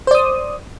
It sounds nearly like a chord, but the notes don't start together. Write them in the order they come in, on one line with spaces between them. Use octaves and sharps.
C5 D5 D#6